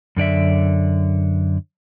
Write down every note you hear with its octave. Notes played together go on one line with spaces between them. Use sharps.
F#2 D3 D5 E5